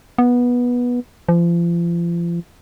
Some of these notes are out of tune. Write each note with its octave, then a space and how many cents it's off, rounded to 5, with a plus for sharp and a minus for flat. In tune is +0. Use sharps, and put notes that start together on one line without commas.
B3 -15
F3 -35